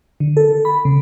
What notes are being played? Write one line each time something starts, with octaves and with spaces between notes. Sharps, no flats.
D3
A4
B5
C#3